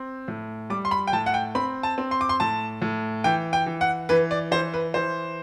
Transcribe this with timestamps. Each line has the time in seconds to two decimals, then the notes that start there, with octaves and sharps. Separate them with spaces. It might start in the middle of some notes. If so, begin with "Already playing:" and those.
Already playing: C4
0.28 A2
0.70 G3 D6
0.85 C6
0.91 B5
1.07 G5
1.13 A2 A5
1.26 F#5
1.34 G5
1.55 C4 B5
1.83 A5
1.98 C4
2.11 C6
2.21 D6
2.29 C6
2.40 A2 A5
2.82 A2
3.24 E3 G5
3.53 G5
3.66 E3
3.81 F#5
4.09 E3 B4
4.31 D5
4.51 E3 C5
4.74 B4
4.94 E3 C5